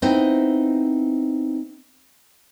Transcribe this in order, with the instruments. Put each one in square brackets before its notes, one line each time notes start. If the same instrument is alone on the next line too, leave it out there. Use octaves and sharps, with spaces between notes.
[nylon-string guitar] B3 C4 D#4 E4 C5